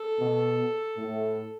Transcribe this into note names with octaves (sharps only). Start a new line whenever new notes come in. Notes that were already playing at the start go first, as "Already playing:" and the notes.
Already playing: A4
B2
A2